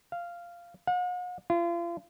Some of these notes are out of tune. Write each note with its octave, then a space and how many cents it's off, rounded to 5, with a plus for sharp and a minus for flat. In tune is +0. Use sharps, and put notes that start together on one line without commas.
F5 -10
F#5 -45
F4 -35